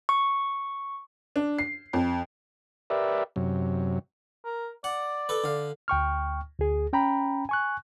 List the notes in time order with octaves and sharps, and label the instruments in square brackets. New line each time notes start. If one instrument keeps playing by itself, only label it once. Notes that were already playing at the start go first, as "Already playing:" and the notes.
[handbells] C#6
[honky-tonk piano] D4
C7
F2
[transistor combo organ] G4 A#4 B4 D5 E5
F#2 C3 F#3
[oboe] A#4
[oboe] D5 [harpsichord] F#5
[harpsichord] A4 B4
D3 F5
[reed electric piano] D2 G5 C#6 F6
D2 G#4
C#4 G5 A#5 B5
G#5 C#6 F#6